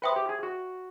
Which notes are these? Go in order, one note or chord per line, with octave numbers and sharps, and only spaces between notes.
B4 C5 E5 G5 C6 D#6
G4
G#4
F#4